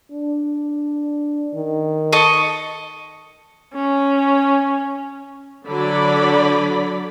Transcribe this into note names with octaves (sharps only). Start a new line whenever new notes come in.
D4
D#3
A4 D#5 C#6
C#4
D3 F#3 D5 B5